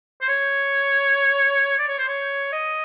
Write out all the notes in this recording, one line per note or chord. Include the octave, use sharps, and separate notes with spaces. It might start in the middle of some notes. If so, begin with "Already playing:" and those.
C5
C#5
D5
C#5
C5
C#5
D#5